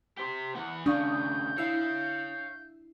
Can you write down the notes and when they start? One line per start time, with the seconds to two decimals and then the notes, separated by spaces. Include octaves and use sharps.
0.17 G4 C5 B6
0.55 E3 B3 F#5
0.86 D#2 C#3 D4 F5 C#6 D#6 G6
1.58 E4 C#5 F5 E6 C7